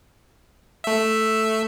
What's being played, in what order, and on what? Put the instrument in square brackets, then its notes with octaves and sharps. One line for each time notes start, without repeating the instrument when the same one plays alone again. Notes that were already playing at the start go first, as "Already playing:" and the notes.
[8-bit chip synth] A3 E5